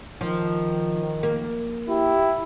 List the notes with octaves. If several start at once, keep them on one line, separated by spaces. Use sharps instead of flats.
D#3 F3
A#3
E4 G4